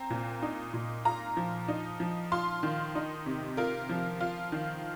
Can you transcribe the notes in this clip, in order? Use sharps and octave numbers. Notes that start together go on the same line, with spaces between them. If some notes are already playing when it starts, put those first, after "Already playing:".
Already playing: C4 A#5
A#2
D#4
A#2
F4 A#5
F3
D#4
F3
F4 C6
D#3
D#4
C3
F4 A#4
F3
F4
D#3